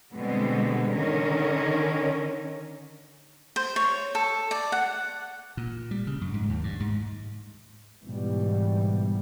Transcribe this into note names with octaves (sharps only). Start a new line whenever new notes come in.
B2 D3 G3 G#3 B3 C4
D3 D#3 C#4 A#4
C5
C#5
A4
D5
F#5
A#2
G3
C#3
F#2
G#2
D#2
G2
G#2
G#2 B2 E3 G3